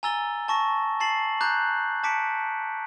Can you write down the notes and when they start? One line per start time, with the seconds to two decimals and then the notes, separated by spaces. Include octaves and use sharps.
0.03 G#5 A#5 E6 A6 G7
0.48 A5 C#6 A#6
1.00 A5 A6 C7 F#7
1.41 A5 A#5 D6 F#6 G6
2.04 A5 D6 B6 C#7 D7